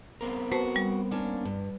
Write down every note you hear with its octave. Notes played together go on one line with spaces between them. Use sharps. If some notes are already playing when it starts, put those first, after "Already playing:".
B3 C4 A#4
F#4 B4 C5 A5
G3
A#3 C#4 D4
G2